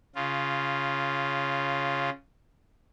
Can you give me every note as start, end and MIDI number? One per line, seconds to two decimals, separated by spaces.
0.15 2.10 49
0.15 2.10 65